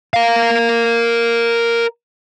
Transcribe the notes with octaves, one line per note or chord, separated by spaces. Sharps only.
A#4 F5